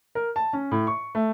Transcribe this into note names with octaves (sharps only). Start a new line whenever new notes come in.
A#4
A5
C#4
A2
C#6
A3